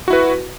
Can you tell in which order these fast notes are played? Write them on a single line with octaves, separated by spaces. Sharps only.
F#4 E4 B4